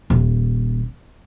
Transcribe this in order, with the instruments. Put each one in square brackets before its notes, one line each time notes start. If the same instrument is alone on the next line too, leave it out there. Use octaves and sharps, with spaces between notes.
[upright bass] D#1